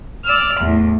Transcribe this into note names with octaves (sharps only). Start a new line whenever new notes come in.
D5 E6 F6
E2 A2